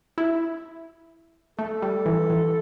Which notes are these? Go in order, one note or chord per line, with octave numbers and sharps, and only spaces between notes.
E4
A3 A4
G3
E3
E3